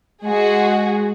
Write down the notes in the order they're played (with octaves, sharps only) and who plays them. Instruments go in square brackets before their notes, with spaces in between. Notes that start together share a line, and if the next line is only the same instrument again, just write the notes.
[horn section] G#3 [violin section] F#4 G#4